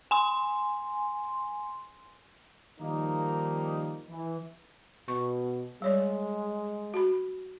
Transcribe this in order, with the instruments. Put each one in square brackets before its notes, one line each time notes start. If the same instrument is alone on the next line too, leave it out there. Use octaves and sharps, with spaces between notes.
[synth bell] G#5 C6
[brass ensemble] D#3 F3 G3 A#3 D#4
E3
[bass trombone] B2 [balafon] C#6
[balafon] G3 C#5 D5 [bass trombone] G#3
[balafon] F#4 B5